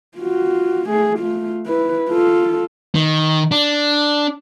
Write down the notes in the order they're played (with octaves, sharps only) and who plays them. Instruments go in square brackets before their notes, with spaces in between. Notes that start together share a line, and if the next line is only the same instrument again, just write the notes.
[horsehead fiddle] F4 F#4
A3 G#4
A3 F4
E4 B4
F4 A4
[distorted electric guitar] D#3
D4